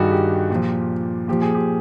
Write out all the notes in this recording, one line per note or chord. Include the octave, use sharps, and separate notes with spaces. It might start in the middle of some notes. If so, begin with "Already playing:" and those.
Already playing: G2 D#3 F#4 G#4
G4
A#2 F3
A#2 F3 G4
G#4
G4